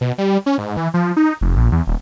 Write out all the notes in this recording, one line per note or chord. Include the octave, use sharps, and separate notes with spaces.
B2
G3
C#4
G#2
E3
F3
D#4
F1
A#1
E2
D#1